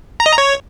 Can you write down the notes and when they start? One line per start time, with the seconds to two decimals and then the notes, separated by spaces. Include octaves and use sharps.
0.20 A#5
0.26 D#5
0.32 A#5
0.38 C#5